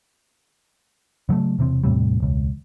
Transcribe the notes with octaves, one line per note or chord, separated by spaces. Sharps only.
C#3 F#3 G#3 A3
E1 C3 E3 C4
E2 A2 C3 G3
E1 C#2